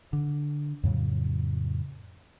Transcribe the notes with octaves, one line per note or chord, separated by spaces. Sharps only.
D3
F2 A2 C#3 F#3